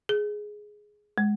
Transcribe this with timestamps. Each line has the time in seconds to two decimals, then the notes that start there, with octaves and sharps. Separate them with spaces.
0.09 G#4
1.18 G#3